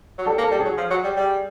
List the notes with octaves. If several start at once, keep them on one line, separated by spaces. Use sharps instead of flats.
F#3
G3 A4
A#3
A4
G3
G#4
F#3
F3
F#3
G3
G3